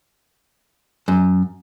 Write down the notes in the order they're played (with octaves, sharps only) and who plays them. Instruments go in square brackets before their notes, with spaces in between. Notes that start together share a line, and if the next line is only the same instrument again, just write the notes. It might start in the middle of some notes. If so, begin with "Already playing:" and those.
[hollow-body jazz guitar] F#2